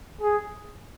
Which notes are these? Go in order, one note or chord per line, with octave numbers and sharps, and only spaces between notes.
G#4